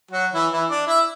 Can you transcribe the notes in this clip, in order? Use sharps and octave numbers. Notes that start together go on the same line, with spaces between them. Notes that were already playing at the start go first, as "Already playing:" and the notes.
F#3 F#4
E3 E4
E3 E4
D4 D5
E4 E5